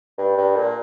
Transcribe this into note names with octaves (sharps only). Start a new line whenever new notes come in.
G2
G2
A#2